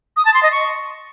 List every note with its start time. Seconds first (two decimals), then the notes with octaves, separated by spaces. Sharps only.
0.16 D#6
0.25 A5
0.34 C6
0.43 D#5
0.52 C#6